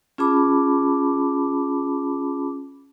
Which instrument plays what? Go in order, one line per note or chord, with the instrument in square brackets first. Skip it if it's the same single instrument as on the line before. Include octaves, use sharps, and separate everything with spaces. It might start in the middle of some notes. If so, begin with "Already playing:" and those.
[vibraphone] C#4 F4 G#4 A5 B5 D6